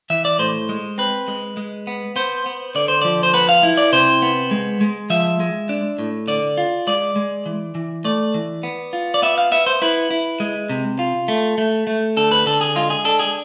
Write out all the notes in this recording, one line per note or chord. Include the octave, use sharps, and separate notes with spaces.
E3 E5
D5
A2 C5
G#3
C4 B4
G#3
G#3
B3
B3 C5
B3
D3 D5
C5
F3 D5
C5
B3 B4
F5
E4
D5
C3 C5
B3
G#3
G#3
F3 E5
G#3
D4
A2
D3 D5
F4
G#3 D5
G#3
E3
E3
A3 D5
E3
B3
F4
D5
B3 E5
F5
B3 E5
C5
E4 B4
E4
G#3
C3
F4
A3
A3
A3
D3 A4
B4
D3 A4
G#4
G#3 F4
G#4
D4 A4
G#4